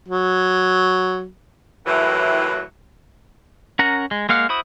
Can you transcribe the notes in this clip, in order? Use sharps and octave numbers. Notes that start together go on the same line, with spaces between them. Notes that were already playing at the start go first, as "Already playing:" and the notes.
F#3
D#2 A2 E3 F#3 E4
C#4 A#4 F#5 A#5
G#3
G#3 A#3 F5 F#5 F6
E4 F#4 C5 B5 D#6